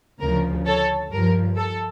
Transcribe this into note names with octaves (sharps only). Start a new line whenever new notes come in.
D2 C#3 F3 A#4
A4 C#5
G2 F3 A#4
A4